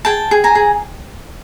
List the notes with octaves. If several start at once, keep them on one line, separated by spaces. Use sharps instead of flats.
G#4 G5 A5
G#4
G#5 A#5
G#4